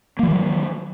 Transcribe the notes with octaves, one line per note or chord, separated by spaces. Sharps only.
D#3 F3 F#3 A#3